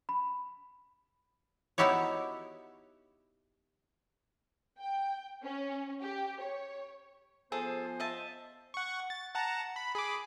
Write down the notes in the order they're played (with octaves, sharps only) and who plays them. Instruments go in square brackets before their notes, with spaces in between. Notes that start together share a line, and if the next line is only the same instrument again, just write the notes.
[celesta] B5
[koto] B3 D#4 E4 F#4 G4 C#5
[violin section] G5
C#4
G4
C#5
[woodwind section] F3 B3 C5 [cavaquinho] G#4 A4 A5
[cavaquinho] D#5 E5 A5
[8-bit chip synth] F#5 C#6
A6
F#5 A5 A#5
B5
G#4 B5 D6